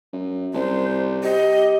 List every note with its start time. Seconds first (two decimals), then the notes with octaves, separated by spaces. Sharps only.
0.13 F#2
0.54 C2 C5
1.24 G4 D#5